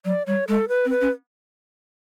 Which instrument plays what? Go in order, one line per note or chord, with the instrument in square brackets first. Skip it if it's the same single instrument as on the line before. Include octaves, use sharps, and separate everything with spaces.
[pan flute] F#3 [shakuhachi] D5
[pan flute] G3 [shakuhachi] C#5
[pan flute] G#3 [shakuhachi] A4
[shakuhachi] B4
[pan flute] C4
[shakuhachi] B4
[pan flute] C#4